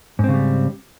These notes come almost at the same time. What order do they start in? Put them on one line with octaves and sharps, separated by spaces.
G#2 C4 C#3 G3